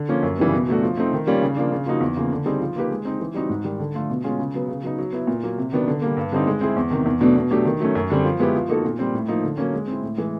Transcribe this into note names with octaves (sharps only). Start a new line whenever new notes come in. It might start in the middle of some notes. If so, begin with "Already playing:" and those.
Already playing: D3
F3 A#3 C#4
F#2
C#3 E3 G3 B3
B2
F#3 A3 D4 F#4
F3
A3 C4 D#4
D#3
G3 A#3 C#4 F4
C#3
F3 A#3 D4
C#3
F3 A#3 D#4 F#4
E2
C#3 F3 A#3
D3
G3 C4 D#4 G#4
F3
A#3 D#4 G4 B4
G#3
C4 D#4
E3
G3 C4 D#4 F#4
G#2
D#3 G3
D3
F3 A3 D4 F4
B2
G#3 C#4 F4 G#4
C#3
F#3 B3
C#3
F#3 B3 D#4
F#3
B3 E4
A#2
F#3 A#3
C3
D#3 F#3 B3 D4
D3
G3 A#3
G2
D3 G3 C4 D#4
G#3
C4 E4 G#4
E2
C3 D#3
E2
B2 F#3 A3 D4
B2
F#3 A3 D4 G4
D#3
F#3 A3 C#4
F#2
D3 G3 C4
F3
G#3 B3 E4 G4
F3
A#3 D#4 F#4 A4
A#2
G3 C4
A2
F3 A#3 D#4
D3
F#3 A#3 C#4
G#3
C4 E4
A2
E3 G#3